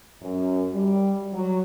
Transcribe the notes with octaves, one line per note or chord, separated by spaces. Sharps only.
F#2
G3
F#3